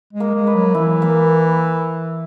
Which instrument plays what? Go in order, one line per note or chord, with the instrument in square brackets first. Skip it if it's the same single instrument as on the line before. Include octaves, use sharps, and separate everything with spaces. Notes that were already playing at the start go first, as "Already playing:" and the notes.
[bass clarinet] G#3
[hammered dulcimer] A#3
[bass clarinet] G#3
[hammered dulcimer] B4
[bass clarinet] F#3
[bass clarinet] E3 [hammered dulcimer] E4
[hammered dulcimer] A#3